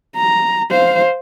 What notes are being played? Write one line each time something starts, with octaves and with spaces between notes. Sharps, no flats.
A#5
C5 F5